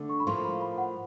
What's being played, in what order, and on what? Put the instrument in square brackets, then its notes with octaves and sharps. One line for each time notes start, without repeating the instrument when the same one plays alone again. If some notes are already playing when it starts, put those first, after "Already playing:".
Already playing: [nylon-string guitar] D3 A3 D4
[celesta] C#6
B5
[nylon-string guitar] A2 F3 A#3 [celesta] C6
[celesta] B5
B5
F#5